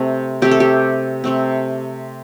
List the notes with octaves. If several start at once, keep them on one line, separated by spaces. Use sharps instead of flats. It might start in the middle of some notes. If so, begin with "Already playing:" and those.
Already playing: C3 A3 C4
C3 A3 C4 G4
A4
G4
C3 A3 C4